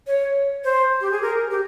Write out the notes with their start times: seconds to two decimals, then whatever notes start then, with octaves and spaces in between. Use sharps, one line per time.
0.07 C#5
0.64 C5
1.01 G4
1.12 G#4
1.22 A#4
1.51 G4